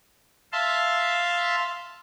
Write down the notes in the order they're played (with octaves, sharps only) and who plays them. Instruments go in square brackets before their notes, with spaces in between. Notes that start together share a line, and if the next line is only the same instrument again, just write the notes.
[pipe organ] E5 F5 A5 C6